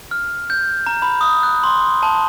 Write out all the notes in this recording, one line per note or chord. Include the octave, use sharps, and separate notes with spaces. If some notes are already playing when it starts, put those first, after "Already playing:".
F6
G6
A#5
B5
D#6
F#6
C6
A5